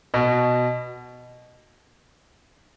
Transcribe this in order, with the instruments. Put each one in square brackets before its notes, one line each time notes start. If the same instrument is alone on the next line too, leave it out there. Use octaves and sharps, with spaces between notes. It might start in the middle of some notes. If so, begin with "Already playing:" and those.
[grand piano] B2